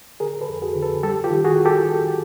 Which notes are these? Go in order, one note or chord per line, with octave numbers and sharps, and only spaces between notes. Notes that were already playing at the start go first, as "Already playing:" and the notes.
D3 G#4 A#4
A4 B4
F2
F#4 G#4
D3
A4 B4
G3 G4 A4
F4 G4
D#3
F#4 G#4
G4 A4